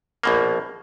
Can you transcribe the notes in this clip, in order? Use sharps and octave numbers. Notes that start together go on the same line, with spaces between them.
A#1 B2 A#3